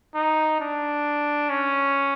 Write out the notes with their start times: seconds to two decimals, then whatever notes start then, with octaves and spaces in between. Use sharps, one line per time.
0.15 D#4
0.60 D4
1.50 C#4